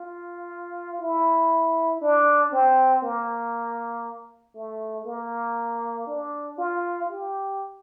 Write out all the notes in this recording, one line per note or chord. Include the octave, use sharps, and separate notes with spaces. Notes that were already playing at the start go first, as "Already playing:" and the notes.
Already playing: F4
E4
D4
C4
A#3
A3
A#3
D4
F4
G4